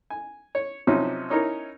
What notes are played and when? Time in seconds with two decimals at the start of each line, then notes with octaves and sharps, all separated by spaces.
0.10 G#5
0.55 C#5
0.87 C3 F3 F#3 C#4 D#4
1.30 C#4 D#4 E4 A#4 C#5